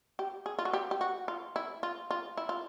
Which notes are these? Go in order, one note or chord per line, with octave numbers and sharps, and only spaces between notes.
G4
G#4
F4
F#4
G4
G4
F#4
F4
E4
F4
F4
E4
F4